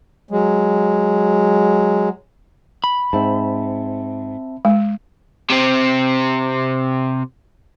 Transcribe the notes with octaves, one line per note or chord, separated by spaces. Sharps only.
F#3 G#3
B5
G#2 C4 E5 A5
G#3
C3 C4